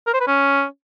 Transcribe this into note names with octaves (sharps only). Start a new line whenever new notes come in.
A#4
C5
B4
C#4